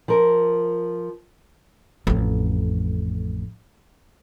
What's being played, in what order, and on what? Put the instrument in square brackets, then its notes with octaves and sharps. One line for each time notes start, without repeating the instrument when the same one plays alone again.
[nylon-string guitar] F3 A#4
[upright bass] A1 F2